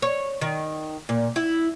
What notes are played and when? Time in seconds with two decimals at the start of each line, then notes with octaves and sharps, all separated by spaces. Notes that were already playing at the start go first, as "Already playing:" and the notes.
0.02 C#5
0.41 D#3
1.09 A#2
1.36 E4